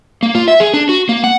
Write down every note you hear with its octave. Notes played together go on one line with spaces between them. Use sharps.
A#3
F4
E5
G#4
D4
F#4
A#3
F#5